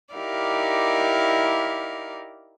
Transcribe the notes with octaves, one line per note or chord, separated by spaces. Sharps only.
D#4 E4 G4 A#4 D5 F5